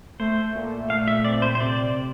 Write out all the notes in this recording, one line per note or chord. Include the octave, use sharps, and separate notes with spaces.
A3 C5
A#2
A3 F5
E5
C4 D5
C5
C5
C3 D5
C3